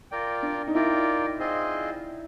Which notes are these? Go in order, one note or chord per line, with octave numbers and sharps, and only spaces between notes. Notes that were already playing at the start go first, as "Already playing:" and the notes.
F4 A#4 D5 G5
D4
D#4
E4 F4 A#4 D5 G5
C4 F4 G#4 C5 D#5